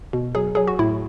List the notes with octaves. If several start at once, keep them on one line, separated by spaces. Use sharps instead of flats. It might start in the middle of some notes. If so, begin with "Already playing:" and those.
B2
F#3 G#4
F#3 G#4
F#4
A2 E4